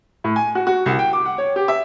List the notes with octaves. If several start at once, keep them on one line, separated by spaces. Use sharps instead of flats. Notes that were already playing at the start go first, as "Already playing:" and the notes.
A2
G#5
F#4
F#4
C2
G5
D6
F#5
C#5
G4
E5